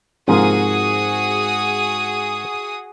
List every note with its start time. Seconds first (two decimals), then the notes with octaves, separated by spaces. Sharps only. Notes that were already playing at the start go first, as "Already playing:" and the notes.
0.28 G#2 C3 F3 A#3 F#4 G#4 D#6